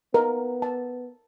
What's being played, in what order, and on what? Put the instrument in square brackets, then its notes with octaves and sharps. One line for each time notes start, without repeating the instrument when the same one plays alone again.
[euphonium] B3 [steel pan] A#4
[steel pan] A5